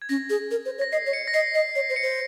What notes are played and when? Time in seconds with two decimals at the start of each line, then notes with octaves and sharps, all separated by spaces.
0.02 G#6
0.09 C#4 A#6
0.30 G#4
0.51 A#4
0.65 C5
0.78 C#5
0.82 A#6
0.92 D#5 C7
1.06 C#5
1.13 C#7
1.27 A#6
1.34 D#5 C7
1.54 D#5 C7
1.75 C#5 C7
1.90 C5
1.96 C#7
2.03 C5